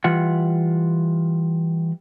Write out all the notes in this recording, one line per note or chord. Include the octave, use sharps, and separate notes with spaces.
E3 G3 F4 F#5